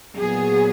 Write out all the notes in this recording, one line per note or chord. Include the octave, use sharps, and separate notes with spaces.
A#2 F#3 B3 G#4